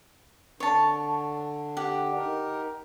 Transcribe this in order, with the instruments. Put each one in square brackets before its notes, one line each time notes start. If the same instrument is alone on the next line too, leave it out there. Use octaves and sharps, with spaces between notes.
[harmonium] D3 D4 [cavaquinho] C#5 A5
[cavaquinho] G4 F#5
[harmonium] D#4 A#4